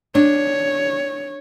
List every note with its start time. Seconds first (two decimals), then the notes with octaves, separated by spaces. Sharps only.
0.15 D4 C#5